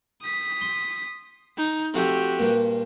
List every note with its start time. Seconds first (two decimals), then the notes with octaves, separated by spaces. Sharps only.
0.22 D#6 B6
0.61 C6
1.57 D#4
1.94 C3 F3 A3 F#4 G4
2.39 G2 A#2